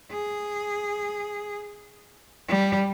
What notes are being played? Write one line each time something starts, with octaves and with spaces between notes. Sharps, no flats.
G#4
G3